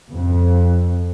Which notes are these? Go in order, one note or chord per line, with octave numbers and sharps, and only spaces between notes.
F2